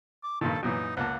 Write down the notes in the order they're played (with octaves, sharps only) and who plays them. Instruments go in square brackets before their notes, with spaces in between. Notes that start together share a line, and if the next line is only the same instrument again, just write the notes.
[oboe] D6
[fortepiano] G2 A#2 D#3 [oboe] A4
[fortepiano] F#2 A#2 E3 [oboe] D#4
[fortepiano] C#2 A#3 A5 [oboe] F#5